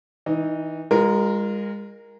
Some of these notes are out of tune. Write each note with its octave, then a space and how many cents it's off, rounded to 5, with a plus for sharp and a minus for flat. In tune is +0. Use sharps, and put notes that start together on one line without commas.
E3 -30 D#4 -10
G#3 -35 F4 +0 A#4 +0